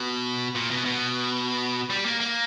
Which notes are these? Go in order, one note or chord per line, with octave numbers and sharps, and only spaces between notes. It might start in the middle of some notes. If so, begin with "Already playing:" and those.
Already playing: B2
A#2
B2
B2
G3
A#3
A#3